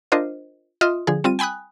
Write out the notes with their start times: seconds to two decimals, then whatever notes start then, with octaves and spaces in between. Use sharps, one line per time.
0.12 D4 F4 A#4 C5 D#5
0.81 F4 D#5 E5 C6 D#6 F6
1.07 D3 F3 G#4
1.24 G3 C4 F4 D#7
1.39 G5 G#5 B5 D#6 F#6